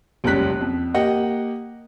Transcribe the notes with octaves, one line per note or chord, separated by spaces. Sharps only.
F#1 C#2 G3 C#4 F#6 B6
F2
A#3 G4 D#5 F#5